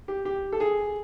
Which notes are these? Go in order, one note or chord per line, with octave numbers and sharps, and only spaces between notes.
G4
G4
A4
G#4